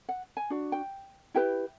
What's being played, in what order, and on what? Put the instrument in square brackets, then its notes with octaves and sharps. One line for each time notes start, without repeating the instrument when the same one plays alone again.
[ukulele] F#5
G#5
D4 F#4
G5
E4 G4 B4 G5